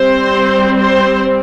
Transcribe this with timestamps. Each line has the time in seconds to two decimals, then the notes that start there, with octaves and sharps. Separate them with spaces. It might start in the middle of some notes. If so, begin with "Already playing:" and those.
Already playing: G3 C4 C5
0.79 C5